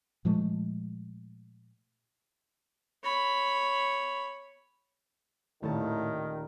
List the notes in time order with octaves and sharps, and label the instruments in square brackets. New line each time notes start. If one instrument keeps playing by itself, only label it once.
[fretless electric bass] A#2 F3 G#3 A3
[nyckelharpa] C#5 B5
[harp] D#1 A5 [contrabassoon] A2 [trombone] D#3